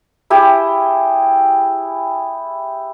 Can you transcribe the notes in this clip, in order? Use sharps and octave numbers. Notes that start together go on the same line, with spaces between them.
E4 G4 G#4